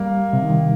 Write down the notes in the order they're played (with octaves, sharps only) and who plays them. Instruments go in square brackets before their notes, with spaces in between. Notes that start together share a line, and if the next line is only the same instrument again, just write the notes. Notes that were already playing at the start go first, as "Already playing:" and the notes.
Already playing: [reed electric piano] G3 [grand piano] A#3
[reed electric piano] C3
D#3